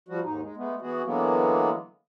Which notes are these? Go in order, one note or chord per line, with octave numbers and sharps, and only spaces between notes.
F3 G3 F#4
D#2 G#2 D#4
G#3
G#3 A3 B3
E3 B3 F#4 G#4
D3 E3 F#3 G#3 A#3 B3